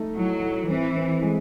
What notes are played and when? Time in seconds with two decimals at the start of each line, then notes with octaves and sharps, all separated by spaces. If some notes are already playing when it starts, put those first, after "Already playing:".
Already playing: A3 D#4
0.17 A2 F#3
0.42 A2
0.69 E3 C4
0.96 C4
1.22 G#3